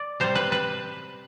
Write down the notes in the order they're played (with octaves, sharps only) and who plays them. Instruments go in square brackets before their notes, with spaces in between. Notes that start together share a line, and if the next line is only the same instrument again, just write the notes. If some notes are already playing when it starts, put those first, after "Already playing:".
Already playing: [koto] D5
C3 G3 C5
B4
B4